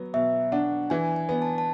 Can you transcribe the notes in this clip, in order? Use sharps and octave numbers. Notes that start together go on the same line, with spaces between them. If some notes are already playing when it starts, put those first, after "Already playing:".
Already playing: F#3 B3
B2 E5
D4 F#5
E3 G#5
G#5
B3
A5
A5